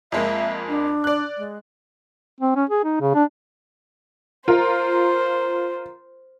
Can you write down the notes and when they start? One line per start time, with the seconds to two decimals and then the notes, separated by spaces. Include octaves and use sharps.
0.12 F2 G#3 A#3 E5
0.68 D4
1.04 D5 F#6
1.37 G#3
2.41 C4
2.56 C#4
2.70 G#4
2.84 D#4
3.01 C#3
3.15 D4
4.48 F4 A#4 C5